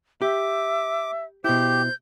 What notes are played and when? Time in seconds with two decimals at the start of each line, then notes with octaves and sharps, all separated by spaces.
0.22 G4 E5 D6
1.44 B2 E4 G4 C5 G6